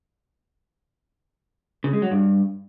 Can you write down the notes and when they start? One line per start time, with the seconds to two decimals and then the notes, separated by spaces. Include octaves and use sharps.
1.84 C#3
1.93 G#3
2.02 F#3
2.11 G2